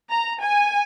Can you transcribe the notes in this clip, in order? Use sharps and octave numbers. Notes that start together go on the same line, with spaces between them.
A#5
G#5